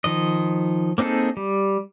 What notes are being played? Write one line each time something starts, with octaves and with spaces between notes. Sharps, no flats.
D#3 F3 D#5
A#3 C4 D#4 G#4 A4
G3